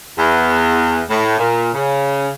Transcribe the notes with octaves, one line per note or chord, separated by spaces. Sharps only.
E2
A2
A#2
C#3